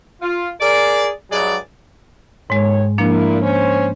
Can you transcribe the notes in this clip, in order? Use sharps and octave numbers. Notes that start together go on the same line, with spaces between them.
F4
G#4 A#4 D5
G2 F#3 G#3 G#4 D5
G#2 D#3 G#3 C#5
A#2 F3 A#3 D4 E4 A#4
C#4 C5